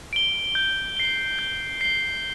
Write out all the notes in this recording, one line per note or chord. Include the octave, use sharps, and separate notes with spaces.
D7 G7
G6
C7 G7
G6
C7 G7